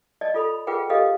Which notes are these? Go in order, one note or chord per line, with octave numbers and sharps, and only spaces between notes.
D5 D#5 A5
F4 A4 B5
F4 G#4 A#4 B4 F#5 G5
G4 A4 B4 D#5 F5